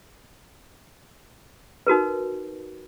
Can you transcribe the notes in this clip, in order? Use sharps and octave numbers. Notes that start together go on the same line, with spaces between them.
D#4 F#4 A#4 B4